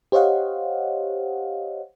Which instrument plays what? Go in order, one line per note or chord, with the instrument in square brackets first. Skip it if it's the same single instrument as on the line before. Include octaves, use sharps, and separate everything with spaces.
[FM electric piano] G4 C5 C#5 D#5 F5 F#5